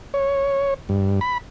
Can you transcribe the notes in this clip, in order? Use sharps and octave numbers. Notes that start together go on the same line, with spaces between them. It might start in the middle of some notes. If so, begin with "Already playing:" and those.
C#5
G2
B5